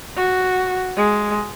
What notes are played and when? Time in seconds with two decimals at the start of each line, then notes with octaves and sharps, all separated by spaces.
0.17 F#4
0.97 G#3